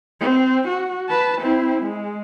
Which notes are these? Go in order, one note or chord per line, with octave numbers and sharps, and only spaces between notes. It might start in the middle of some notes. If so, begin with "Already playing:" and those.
C4
F#4
B4 A5
C4 E4
G#3